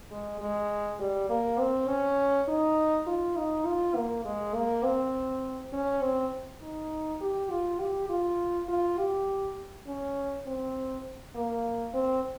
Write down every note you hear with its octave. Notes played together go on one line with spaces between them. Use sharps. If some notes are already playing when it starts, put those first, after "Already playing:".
G#3
G#3
G3
A#3
C4
C#4
D#4
F4
D#4
F4
A#3
G#3
A#3
C4
C#4
C4
D#4
G4
F4
G4
F4
F4
G4
C#4
C4
A#3
C4